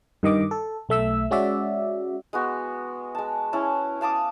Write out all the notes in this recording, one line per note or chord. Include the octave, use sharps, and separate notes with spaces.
G2 D#3 D#5 D6
A4
B1 A3 E5 E6
G#3 C#4 F#4 D5 E5
G#3 B3 F#4
G#3 A5
C#4 E4 A5
F5 A5 D6 D#6